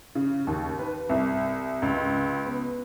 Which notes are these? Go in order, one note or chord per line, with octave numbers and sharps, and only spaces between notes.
C#3
D#2
B4
C2
C#2
B3